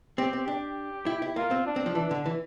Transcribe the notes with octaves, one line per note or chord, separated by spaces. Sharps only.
C4 G4
C4
D4 G4
E4
E4
A#3 F4
C4
D4
C4
F3
E3 D4
D3
E3